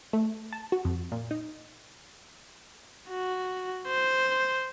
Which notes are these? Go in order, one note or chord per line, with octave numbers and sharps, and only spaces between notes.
A3
A5
F#4
F2
A#2
D#4
F#4
C5